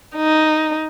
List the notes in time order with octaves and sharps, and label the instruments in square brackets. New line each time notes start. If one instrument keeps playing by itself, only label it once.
[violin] D#4